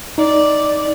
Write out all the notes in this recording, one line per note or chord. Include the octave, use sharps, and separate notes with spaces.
D#4 D5